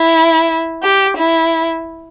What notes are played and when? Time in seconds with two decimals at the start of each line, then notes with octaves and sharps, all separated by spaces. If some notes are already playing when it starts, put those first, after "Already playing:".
Already playing: E4
0.83 G4
1.18 E4